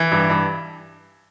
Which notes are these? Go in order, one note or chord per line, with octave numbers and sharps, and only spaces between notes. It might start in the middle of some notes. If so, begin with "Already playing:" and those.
Already playing: E3
G2
G2